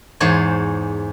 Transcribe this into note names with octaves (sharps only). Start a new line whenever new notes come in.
E2 G#2 C5 C#5